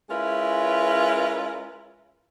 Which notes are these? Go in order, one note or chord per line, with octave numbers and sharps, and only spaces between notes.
G#3 C#4 E4 F4 A#4 B4